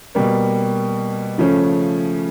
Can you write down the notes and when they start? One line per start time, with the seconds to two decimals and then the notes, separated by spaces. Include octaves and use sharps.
0.15 B2 G3 A#3
1.38 C#3 F3 A3 C#4